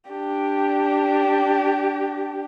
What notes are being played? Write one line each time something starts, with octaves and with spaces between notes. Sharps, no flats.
D4 G4